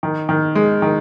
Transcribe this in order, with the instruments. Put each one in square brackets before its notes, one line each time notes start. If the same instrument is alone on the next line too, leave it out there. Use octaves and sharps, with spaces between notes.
[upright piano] D#3
D#3
G#3
D#3